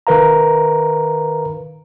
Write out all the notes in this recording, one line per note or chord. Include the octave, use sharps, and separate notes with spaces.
D#3 A#4 B4 F5 A#5